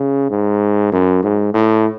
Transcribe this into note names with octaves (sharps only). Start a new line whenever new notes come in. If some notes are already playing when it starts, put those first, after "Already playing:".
Already playing: C#3
G#2
F#2
G#2
A2